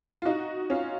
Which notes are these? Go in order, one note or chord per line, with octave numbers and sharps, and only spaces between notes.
F4
D#4 F#4
C#4 F4